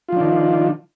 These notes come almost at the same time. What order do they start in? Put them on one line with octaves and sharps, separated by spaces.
F4 F3 D4 D#3